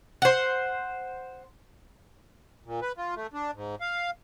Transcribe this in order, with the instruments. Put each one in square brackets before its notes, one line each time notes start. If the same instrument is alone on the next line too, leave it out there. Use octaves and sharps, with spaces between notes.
[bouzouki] C5 F#5
[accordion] A#2
B4
F4
A3
D4
G#2
F5